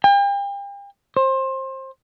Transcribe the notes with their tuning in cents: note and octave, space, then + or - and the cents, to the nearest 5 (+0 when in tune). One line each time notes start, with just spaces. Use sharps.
G5 +40
C5 +25